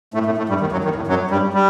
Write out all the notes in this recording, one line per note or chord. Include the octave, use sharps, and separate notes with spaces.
A2 A3
A2 A3
A2 A3
G2 G3
D#2 D#3
F#2 F#3
D#2 D#3
A2
F#2 F#3
G2 G3
G3